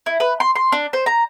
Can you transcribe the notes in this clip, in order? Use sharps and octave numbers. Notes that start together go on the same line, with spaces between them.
E4
B4
C6
C6
D4
C5
A#5